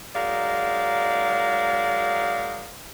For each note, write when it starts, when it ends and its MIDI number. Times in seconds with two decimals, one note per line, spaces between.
0.16 2.75 54
0.16 2.75 56
0.16 2.75 63
0.16 2.75 70
0.16 2.75 74
0.16 2.75 77